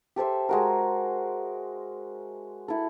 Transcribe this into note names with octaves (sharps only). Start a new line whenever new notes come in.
G4 A4 C5 E5
G#3 F#4 A#4
E4 A4